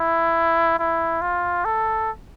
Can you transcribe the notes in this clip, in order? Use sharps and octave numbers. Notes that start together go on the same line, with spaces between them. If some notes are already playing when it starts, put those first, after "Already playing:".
Already playing: E4
E4
F4
A4